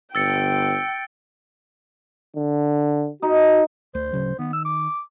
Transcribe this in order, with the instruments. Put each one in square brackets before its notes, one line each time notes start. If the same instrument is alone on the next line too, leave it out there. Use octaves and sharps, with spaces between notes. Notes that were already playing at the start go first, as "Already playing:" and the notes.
[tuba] G1 [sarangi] G5 [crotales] E6 A6 C#7
[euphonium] D3
[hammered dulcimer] D#4 [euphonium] F#4
[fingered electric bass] D2 [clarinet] C5
[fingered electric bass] D1 C#3 F#3
[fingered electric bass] D#3 [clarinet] B3
[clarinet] E6
D6